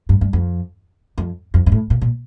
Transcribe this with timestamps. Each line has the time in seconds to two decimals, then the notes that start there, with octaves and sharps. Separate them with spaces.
0.09 G2
0.21 G2
0.33 F2
1.18 F2
1.54 F2
1.66 G2
1.72 A2
1.90 A#2
2.01 A#2